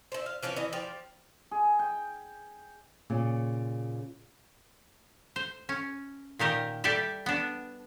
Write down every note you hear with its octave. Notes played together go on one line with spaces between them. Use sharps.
C5 E5
F5
E3 F3 C#4 C#5
E3 D#5
F3 G4
G#4
G5
A#2 C#3
C5
C#4
A#2 D#3 G4 A#4
G3 G4 A4 D5 E5
B3 D4